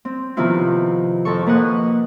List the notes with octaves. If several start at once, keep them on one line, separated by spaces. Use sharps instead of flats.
C4
C3 D#3 F3 B3 E4 F4
F2 C4 A4 C#6
A#3 B4 D#5 F#5